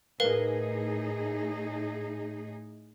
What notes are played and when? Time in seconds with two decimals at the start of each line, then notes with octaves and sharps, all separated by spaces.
0.20 A2 D#4 G#4 A#4 B4 F5